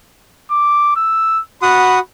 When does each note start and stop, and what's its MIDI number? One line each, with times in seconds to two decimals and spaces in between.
0.51 0.94 86
0.96 1.41 88
1.62 1.99 66
1.62 1.99 78
1.62 2.00 83
1.62 1.99 87